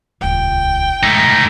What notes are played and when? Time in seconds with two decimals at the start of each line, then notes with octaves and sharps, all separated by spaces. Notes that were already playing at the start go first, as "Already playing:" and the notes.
0.21 D#1 C#2 G5
1.03 G#3 A3 D#4